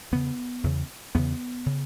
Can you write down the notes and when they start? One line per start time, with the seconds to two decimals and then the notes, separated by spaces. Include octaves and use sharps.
0.12 E2 C#3 B3
0.64 E2 C#3
1.15 E2 C#3 B3
1.66 C#3